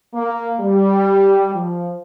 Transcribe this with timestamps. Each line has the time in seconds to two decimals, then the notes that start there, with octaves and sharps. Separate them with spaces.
0.14 A#3
0.60 G3
1.55 F3